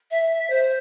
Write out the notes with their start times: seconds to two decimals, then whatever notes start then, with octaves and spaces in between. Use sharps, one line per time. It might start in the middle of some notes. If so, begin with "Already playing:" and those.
0.11 E5
0.50 C5